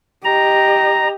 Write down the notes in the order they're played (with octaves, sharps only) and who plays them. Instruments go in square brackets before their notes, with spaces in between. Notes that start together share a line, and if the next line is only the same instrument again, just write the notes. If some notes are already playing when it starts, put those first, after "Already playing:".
[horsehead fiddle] G4 D#5 [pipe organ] A#5